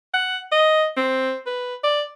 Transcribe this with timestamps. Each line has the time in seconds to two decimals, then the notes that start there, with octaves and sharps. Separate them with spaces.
0.14 F#5
0.52 D#5
0.97 C4
1.46 B4
1.84 D5